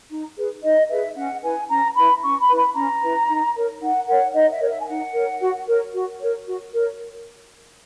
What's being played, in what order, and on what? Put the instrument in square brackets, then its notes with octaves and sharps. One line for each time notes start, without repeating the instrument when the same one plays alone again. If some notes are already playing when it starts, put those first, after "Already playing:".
[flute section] D#4
G#4 B4
D#4 D#5
G#4 B4 E5
C#4 F#5
E4 B4 G#5
C#4 A#5
E4 B4 B5
C#4 C#6
B5
E4 B4
B5
C#4 A#5
E4 B4
D#4
A#4 C#5
D#4 F#5
A#4 C#5 F#5
D#4 D#5
E5
A#4 C#5
E5
G#5
D#4 F#5
A#4 C#5
F#4
A#4 C#5
F#4
A#4 C#5
F#4
A#4 C#5